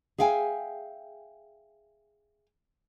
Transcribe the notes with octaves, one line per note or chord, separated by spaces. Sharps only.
G#4 E5 F5 G5 G#5